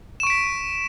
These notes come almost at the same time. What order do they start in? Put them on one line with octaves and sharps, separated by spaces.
E7 C#6 D7 B6